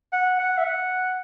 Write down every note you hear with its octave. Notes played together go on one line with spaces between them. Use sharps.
F#5
F#5
E5
F#5